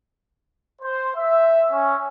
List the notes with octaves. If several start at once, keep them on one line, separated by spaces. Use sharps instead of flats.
C5
E5
C#4